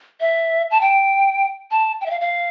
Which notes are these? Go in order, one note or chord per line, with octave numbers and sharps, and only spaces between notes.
E5
A5
G5
A5
G5
E5
F5
F5